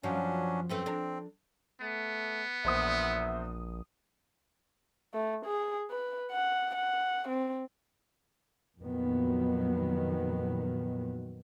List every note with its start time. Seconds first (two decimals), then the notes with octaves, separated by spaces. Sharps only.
0.03 F#2 F3 F#3 C#4 D4
0.69 F#2 A3 C4 B4
0.86 D4 A#4
1.81 A3 B3
2.65 A#1 E2 C5 E5 D#6
5.14 A3
5.46 G#4
5.91 B4
6.31 F#5
6.75 F#5
7.29 C4
8.81 F2 A#2 D#3 F#3 B3